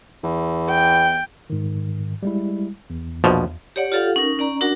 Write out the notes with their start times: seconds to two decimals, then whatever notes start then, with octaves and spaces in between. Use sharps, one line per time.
0.24 E2
0.70 G5
1.50 G#2 D#3
2.23 G3 G#3 E4
2.90 E2
3.24 A#1 B2 F3
3.76 G4 C#5 D5 F#5
3.92 F4 G4 A4 F5 F#5
4.16 C#4 D#4 A#4
4.39 C#4 D5 A#5
4.61 D4 F#4 A#4 F#5